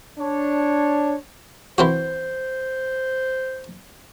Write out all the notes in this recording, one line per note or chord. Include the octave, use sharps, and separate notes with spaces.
D4 C#5
E3 C4 F#4 C5